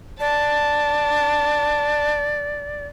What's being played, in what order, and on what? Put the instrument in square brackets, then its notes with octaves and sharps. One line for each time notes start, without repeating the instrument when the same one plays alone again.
[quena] D5 [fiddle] A5